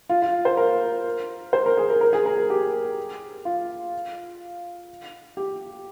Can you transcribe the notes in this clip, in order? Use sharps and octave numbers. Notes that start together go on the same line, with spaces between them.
F4
F4
C5
A#4
C5
A#4
G#4
A#4
A#4
G#4
A#4
A#4
G4
F4
G4